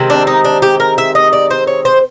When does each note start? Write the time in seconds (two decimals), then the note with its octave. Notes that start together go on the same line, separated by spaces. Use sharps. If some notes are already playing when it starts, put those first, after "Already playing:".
Already playing: C3 D#3 G#3 C4
0.10 D4
0.27 D#4
0.45 D4
0.62 G4
0.80 A#4
0.98 E5
1.15 D#5
1.33 D5
1.50 C5
1.67 C#5
1.85 C5